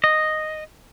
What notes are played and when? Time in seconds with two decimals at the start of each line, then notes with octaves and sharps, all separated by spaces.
0.04 D#5